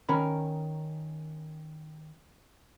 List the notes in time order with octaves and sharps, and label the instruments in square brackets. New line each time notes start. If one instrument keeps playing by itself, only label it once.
[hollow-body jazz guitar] D#3 C#4 A#4 B5